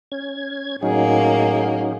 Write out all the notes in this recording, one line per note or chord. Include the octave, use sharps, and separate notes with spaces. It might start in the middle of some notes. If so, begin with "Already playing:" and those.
C#4 G#6
A2 F#3 A#3 C#4 D#4 G#4 F#5